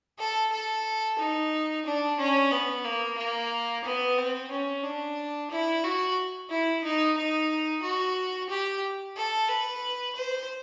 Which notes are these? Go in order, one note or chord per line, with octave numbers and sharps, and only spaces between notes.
A4
A4
D#4
D4
C#4
B3
A#3
A#3
B3
C4
C#4
D4
E4
F#4
E4
D#4
D#4
F#4
G4
A4
B4
C5